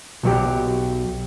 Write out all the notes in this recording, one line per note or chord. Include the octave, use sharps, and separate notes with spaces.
B1 F#3 G4